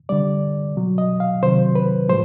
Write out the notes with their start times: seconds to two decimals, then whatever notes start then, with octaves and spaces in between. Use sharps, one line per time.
0.09 D3 G3 D5
0.76 B2 F#3
0.98 D#5
1.20 F5
1.43 C3 D#3 F#3 C5
1.75 B4
2.09 A2 F3 G#3 C5